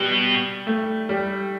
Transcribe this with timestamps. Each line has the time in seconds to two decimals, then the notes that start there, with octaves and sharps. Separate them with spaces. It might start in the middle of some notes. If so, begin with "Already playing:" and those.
Already playing: B2 G3
0.67 A3
1.09 G3